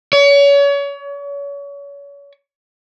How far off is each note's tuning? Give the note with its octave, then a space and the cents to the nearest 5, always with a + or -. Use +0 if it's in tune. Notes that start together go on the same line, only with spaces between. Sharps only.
C#5 +35